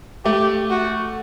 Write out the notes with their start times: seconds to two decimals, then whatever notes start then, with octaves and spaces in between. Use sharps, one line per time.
0.25 A3 G4
0.70 F#4